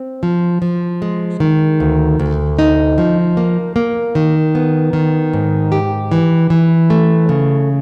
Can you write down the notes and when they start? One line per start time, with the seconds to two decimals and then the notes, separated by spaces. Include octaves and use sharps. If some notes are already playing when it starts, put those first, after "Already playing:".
Already playing: C4
0.23 F3
0.62 F3
1.02 G#3
1.40 D#3
1.80 D2
2.20 D2
2.59 D#4
2.98 F3
3.37 A#3
3.76 A#3
4.15 D#3
4.55 B3
4.93 D#3
5.33 G#2
5.72 G4
6.12 E3
6.50 E3
6.90 A3
7.29 C#3